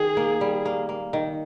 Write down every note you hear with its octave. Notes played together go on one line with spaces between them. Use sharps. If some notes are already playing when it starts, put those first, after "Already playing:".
Already playing: D#3 G#4
A#3
G3
A#3
A#3
D#3